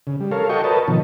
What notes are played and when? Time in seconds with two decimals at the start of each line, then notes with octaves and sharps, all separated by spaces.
0.07 C#3
0.20 G3
0.32 A4 A#4 C#5 F5
0.49 F#4 A4 D#5 G5 C#6
0.64 A#4 B4 C#5 D#5 A5
0.88 B2 D#3 F3